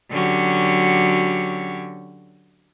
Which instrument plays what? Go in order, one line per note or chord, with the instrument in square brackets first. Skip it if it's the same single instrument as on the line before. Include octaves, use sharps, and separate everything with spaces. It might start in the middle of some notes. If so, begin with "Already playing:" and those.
[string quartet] D3 F#3 C#4 F#4 G4